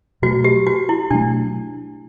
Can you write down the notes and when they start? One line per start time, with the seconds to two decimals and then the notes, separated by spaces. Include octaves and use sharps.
0.22 B2 F#3 A3 F#4
0.44 G4
0.67 F#4
0.89 E4
1.11 B2 F#3 A3 D4